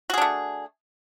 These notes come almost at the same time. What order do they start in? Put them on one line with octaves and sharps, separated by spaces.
F#4 G#4 D4 A3